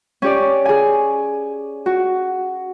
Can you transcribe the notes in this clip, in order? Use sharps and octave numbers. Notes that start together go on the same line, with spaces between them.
C#4 G4 D5
G#4 G#5
F#4